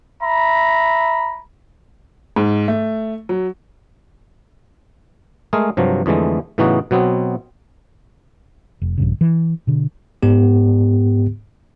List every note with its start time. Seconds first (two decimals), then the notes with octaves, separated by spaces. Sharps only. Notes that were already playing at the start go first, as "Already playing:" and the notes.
0.23 E5 A#5 B5
2.36 G#2
2.68 A3
3.29 F#3
5.53 G#3 A3 G#4 A#4
5.77 G2 C3 F3 F#3
6.06 F2 D3 E3 G#3 A3
6.58 A2 C#3 E3 B3 D#4 F#4
6.91 B2 F#3 B3 C4
8.82 F1
8.98 A#1 G2 C#3
9.21 E3
9.67 B2 D3
10.23 G#2 B3 G4